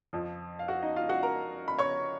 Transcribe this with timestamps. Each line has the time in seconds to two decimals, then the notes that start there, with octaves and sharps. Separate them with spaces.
0.13 F2 F3
0.59 F5
0.68 F#4 F#5
0.82 D#4 D#5
0.96 F4 F5
1.09 F#4 F#5
1.23 A#4 A#5
1.68 B5
1.78 C#5 C#6